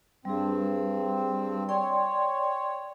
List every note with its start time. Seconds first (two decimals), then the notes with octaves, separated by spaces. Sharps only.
0.25 G2 G3 C4 G#4
1.69 C#5 D5 G5 C6